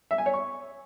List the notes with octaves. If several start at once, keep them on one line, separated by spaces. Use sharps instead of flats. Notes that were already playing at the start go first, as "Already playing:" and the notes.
E5
G#5
C#5
C#6